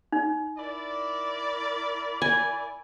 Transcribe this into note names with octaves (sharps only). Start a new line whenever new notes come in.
D#4
E4 A#4 D5
G#5